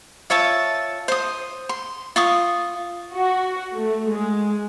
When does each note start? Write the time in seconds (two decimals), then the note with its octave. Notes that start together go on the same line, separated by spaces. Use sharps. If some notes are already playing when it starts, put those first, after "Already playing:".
0.30 F4 C#5 E5 A5
1.08 C5 D#6
1.69 C6
2.16 F4 C#6 D#6
3.14 F#4
3.73 A3
4.12 G#3